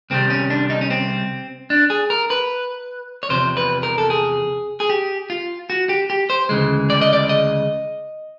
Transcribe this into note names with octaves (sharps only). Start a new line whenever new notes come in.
C2 C3 D#3 G3 C4
C#4
D4
D#4
C#4
C4
D4
G#4
A#4
B4
C#5
E2 C3 F3 C5
B4
A#4
A4
G#4
G#4
G4
F4
F#4
G4
G4
C5
D2 C#3 E3 G#3
D5
D#5
D5
D#5